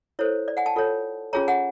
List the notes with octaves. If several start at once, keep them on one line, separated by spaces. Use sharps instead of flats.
E4 A4 C5 C#5
D5
F#5 G#5
G5 A5
F4 A4 C#5
C#4 F4 G#4 C#5 G#5 A#5
F#5 G#5